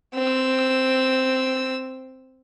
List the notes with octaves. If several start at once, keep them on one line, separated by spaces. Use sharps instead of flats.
C4 E6